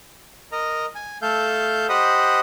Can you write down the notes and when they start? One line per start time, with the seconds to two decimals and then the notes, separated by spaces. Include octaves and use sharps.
0.52 A#4 D#5 A#5
0.95 G#5
1.22 A3 A4 F5 G6
1.89 G4 C5 D#5 F#5 B5 D#6